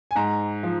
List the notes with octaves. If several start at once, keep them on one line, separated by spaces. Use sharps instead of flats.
G#5
G#2 A#5
F3